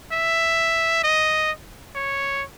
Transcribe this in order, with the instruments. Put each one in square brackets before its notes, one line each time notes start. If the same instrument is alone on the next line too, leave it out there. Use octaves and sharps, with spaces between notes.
[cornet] E5
D#5
C#5